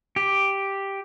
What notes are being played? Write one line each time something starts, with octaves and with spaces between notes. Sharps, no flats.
G4